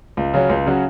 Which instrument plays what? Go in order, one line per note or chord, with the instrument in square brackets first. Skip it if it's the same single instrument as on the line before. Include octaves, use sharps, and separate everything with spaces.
[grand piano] C#2
C#3 F#3 C#4 F#4
C#2
C#3 F#3 C#4 F#4